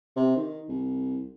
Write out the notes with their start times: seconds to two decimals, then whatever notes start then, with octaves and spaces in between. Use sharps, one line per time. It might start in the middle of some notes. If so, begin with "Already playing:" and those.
0.16 C3
0.36 D#3
0.68 C2